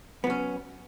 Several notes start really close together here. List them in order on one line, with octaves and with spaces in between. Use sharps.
B3 F#3 C#4